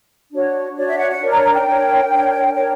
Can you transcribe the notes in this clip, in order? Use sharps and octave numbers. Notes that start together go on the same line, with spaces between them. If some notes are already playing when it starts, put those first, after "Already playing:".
D4 F#4 C#5
D4 F#4 C#5 D5
E5
F#5
F#5
D4 A#4 C#5
A#5
A#5
G5
D4 A#4 C#5
D4 A#4 C#5
D4 A#4 C#5 G5